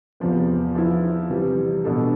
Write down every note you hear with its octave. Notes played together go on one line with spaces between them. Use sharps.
E2 C3 F3 B3
F3 B3 E4
C3 E3 G3
B2 B3 D4 A4